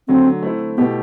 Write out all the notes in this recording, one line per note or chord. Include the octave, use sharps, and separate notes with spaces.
D3 F#3 A3 C4
A3 C4 E4
B2 A3 B3 E4 G4